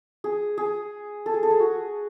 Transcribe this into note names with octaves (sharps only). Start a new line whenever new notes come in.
G#4
G#4
A4
G#4
A4
G#4
F#4